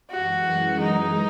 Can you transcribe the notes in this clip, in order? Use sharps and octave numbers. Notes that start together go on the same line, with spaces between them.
F#2 E3 G#3 F#4
D#4